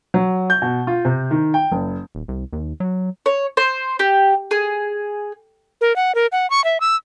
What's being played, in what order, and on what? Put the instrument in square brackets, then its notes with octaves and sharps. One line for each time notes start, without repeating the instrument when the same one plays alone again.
[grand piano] F#3
G6
B2
F4
C3
D#3
G5
F#1
[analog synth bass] D#1
C2
D#2
F#3
[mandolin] C#5
C5
G4
G#4
[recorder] A#4
F#5
A#4
F#5
C#6
E5
E6